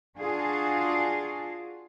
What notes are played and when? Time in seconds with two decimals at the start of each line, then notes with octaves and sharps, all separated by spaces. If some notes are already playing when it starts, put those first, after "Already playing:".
0.17 D4 F4 F#4 G#4